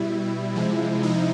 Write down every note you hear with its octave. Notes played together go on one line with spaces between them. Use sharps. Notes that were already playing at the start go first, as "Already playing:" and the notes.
Already playing: B2 G3 E4
C3 F3 G#3
D#4